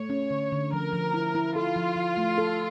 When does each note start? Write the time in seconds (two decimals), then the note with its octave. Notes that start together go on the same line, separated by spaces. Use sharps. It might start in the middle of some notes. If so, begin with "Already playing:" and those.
Already playing: A3 C#5
0.10 C#4
0.30 D3
0.52 D3
0.73 F3 A#4
0.92 F3
1.14 E4
1.35 E4
1.55 F4 A4
1.76 F3
1.96 F3
2.17 A3
2.38 A4